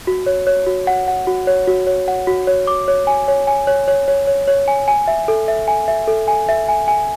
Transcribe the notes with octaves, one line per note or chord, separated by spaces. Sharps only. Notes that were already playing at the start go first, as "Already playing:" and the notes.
F#4
C#5
C#5
F#4
F#5
F#5
F#4
C#5
F#4
C#5
F#5
F#4
C#5
D6
C#5
G#5
C#5
G#5
C#5
C#5
C#5
C#5
C#5
G#5
G#5
E5
A4
E5
G#5
E5
A4
G#5
E5
G#5
G#5